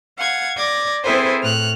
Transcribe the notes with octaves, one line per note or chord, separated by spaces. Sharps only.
F5 F#5 G#6
D5 D6 G#6 A#6
C4 E4 G#4 A4 B4 C5
A2 F6 F#6